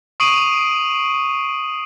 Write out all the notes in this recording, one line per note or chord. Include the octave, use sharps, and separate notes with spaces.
C#6 D#6 C7 D7 D#7 F#7